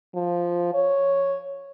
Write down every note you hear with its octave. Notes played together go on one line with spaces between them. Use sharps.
F3
C#5